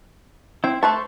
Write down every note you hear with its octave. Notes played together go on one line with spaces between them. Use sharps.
C4 E4 G5
A3 B4 C5 A5 C6 C#6